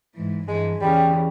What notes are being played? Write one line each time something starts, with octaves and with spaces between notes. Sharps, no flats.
G#2 E3
G2 E3 G#3
E2 C#3 E3 G3